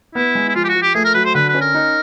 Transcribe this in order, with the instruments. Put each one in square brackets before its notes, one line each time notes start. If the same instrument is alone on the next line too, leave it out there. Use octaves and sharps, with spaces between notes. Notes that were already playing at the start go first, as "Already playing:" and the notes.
[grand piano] B3 [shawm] E4
[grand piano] G#3
[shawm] E4
[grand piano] F3 [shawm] F4
[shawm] G4
F#4
[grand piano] F3
[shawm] G4
[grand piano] A3 [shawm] G#4
[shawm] A#4
[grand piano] F#3 [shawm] B4
[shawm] C5
[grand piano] D3 [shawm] B4
[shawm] B4
[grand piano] C#4
[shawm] A#4
[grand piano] D#4